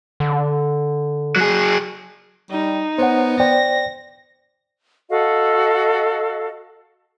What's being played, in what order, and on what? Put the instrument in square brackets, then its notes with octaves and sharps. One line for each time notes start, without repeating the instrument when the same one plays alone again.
[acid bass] D3
[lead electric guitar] F#3 G#4
[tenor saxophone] G3 [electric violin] D#4
[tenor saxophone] B3 [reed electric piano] C5 C#5 F#5
[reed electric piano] C5 D5 G5 [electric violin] A#6
[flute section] F#4 A4 D#5 F5